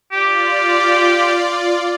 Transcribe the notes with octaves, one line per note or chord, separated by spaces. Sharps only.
F4 G4 D5